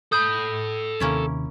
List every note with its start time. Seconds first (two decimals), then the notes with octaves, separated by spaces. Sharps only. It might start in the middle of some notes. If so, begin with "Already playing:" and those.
0.12 A4 B5 D#6 G6
1.00 D#2 C3 D#3 A#3 C#4 E4